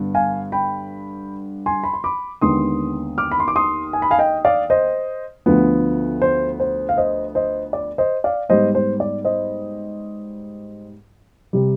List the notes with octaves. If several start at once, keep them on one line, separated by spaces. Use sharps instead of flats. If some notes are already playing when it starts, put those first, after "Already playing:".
Already playing: G2 D3 B3
F5 G#5
G5 B5
G#5 C6
B5
C6
B5 D6
D#2 D3 G#3 B3 C6 D#6
D6 F6
B5
C6
D6
C6 D#6
G#5
B5
F5 G#5
D#5 G5
D5 F5
C5 D#5
D2 D3 F3 B3
C5
C5
F5
C5 D#5
C5 D#5
D5
C5 D#5
D5 F5
G#2 G3 B3 C5 D#5
C5
D5
C5 D#5
C3 G3